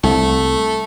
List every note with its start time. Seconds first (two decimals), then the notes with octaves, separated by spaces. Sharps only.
0.03 C2 A3